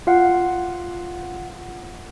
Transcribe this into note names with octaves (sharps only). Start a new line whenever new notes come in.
F4 F5 F#5